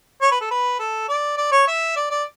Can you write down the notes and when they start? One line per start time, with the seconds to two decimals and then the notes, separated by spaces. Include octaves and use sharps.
0.22 C#5
0.31 B4
0.41 A4
0.51 B4
0.79 A4
1.09 D5
1.37 D5
1.52 C#5
1.68 E5
1.96 D5
2.11 D5